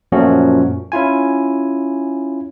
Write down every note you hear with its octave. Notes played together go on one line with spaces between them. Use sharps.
F#2 A#2 F3 A3 C#4 F#4
C#4 E4 F4 G#5